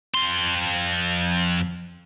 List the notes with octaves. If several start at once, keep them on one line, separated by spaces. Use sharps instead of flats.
F2 C6